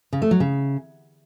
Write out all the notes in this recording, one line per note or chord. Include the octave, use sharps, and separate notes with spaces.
C#3
A3
F#3
C#3